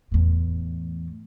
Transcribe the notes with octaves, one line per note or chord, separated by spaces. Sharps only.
E2 A2